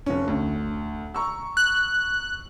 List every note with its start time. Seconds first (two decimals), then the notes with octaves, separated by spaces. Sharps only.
0.06 F1 C#4
0.28 D2
1.14 A#5 C#6 E6
1.57 F#6